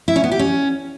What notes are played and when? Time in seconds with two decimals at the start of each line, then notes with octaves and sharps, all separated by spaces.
0.08 E4
0.16 C#4
0.24 B3
0.32 G4
0.39 C#4